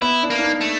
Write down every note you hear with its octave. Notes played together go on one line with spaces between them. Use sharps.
B3 E4
D4
A#3
D4
D#4
A3